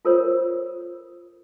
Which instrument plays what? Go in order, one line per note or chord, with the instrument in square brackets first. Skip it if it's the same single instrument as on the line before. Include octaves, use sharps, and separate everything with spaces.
[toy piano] F4 A4 A#4 C5 C#5